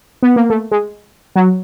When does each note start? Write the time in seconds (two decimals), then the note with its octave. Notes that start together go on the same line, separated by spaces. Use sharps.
0.23 B3
0.36 A#3
0.50 A3
0.71 G#3
1.36 F#3